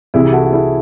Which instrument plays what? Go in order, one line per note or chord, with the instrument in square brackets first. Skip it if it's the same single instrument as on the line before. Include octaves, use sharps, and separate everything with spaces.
[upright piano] C2 C3 E3 [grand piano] E4 G#4
[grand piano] F#4 A4
F#4
E4 G#4